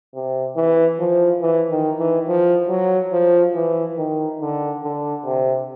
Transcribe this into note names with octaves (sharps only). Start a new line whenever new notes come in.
C3
E3
F3
E3
D#3
E3
F3
F#3
F3
E3
D#3
D3
D3
C3